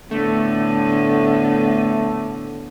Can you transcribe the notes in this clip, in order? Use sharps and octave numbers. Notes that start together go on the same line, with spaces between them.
A2 D3 A3 B3